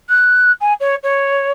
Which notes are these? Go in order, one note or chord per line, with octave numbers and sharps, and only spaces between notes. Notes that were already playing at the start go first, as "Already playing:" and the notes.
F#6
G#5
C#5
C#5